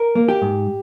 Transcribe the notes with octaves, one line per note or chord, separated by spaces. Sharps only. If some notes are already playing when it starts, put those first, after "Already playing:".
Already playing: A#4
A#3
G4
G#2